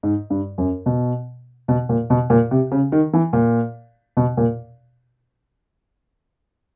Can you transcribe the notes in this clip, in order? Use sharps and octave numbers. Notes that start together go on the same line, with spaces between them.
G#2
G2
F#2
B2
B2
A#2
B2
A#2
C3
C#3
D#3
E3
A#2
B2
A#2